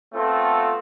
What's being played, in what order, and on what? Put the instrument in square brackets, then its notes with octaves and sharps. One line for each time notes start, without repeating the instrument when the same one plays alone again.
[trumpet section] A3 B3 C4 F4 A4